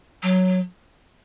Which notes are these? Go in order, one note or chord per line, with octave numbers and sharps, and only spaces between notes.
F#3